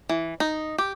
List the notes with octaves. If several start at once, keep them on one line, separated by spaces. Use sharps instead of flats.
E3
D#4
G4